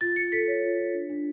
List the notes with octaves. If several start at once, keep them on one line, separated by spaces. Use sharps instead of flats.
F4 A6
F4 C#7
A4 B6
C#5
F4
F4
D4
D4